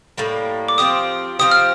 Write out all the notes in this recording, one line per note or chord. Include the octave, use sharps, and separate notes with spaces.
A2 G3 A#3
D6
F3 C4 G4 D#6
F3 C4 G4 D#6
F6